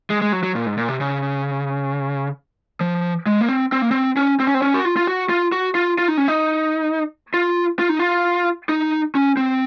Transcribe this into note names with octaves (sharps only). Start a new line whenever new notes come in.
G#3
G#3
F#3
F#3
A#2
G#2
A#2
C3
C#3
F3
G#3
A#3
C4
C4
A#3
C4
C#4
C4
C#4
C4
C#4
F#4
F4
F4
F#4
F4
F#4
F4
F4
D#4
C#4
D#4
F4
F4
D#4
F4
D#4
C#4
C4